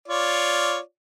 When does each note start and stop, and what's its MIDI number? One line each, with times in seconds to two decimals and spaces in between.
0.08 0.78 65
0.08 0.78 73
0.08 0.78 74